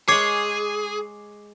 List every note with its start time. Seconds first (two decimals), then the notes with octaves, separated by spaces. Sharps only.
0.08 G#3 G#4 C#5 D6 C7